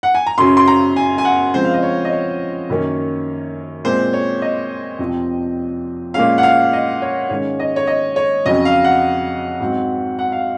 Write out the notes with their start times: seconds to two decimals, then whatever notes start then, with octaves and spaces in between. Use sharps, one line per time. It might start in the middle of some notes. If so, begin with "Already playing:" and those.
0.03 F#5
0.15 G#5
0.27 A#5
0.38 F#2 C#3 F#3 C#4 C6
0.57 C6
0.68 A#5
0.96 G#5
1.18 G#5
1.25 F#5
1.54 C#3 F3 G#3 C4 C5
1.64 F5
1.74 D#5
1.83 C#5
2.05 D#5
2.12 C#5
2.69 F#2 D#3 A#3 C#4
3.84 A#2 G#3 C4 C5
4.13 C#5
4.42 D#5
4.99 F2 C3 F3 C4
6.14 A#2 G#3 C#4 F5
6.38 F#5
6.43 F5
6.73 D#5
7.02 C#5
7.30 G#2 D#3 G#3 C#4 C#5
7.59 D#5
7.76 C#5
7.87 D#5
8.16 C#5
8.46 F2 C#3 F#3 C#4 D#5
8.65 F5
8.84 F#5
9.60 G#2 F#3 C4
10.19 F#5
10.32 F5